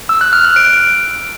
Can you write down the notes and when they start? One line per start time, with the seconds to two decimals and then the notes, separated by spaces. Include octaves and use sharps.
0.09 E6
0.21 F#6
0.33 F6
0.44 F#6
0.56 D7